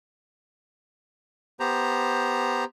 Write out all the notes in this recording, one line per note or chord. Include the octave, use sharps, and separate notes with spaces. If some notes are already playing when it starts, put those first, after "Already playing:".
B3 G4 C5 A#5